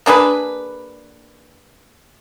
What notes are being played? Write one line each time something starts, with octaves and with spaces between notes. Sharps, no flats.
A#3 D4 G#4 B4